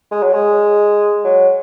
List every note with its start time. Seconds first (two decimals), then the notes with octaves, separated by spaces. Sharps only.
0.12 G#3
0.23 F#3
0.33 G#3
1.24 F#3